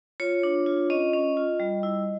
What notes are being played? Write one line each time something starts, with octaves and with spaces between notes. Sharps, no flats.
F4 C#5
D4
F4
C#4 D#5
C#4
F4
G3
E4